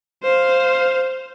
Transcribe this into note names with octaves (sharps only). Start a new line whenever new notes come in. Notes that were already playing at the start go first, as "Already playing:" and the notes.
C5 F5